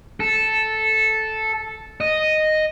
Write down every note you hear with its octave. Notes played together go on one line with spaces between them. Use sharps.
A4
D#5